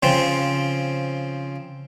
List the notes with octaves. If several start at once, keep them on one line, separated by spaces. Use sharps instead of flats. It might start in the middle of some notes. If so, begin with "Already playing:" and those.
C#3 F3 C4